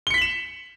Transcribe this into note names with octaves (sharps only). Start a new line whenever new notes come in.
B6 C#7 E7 F#7 G7